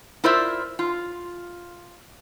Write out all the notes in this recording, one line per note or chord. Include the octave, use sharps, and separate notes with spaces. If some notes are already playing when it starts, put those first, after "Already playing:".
E4 F4 A#4 C5 D5 E5
F4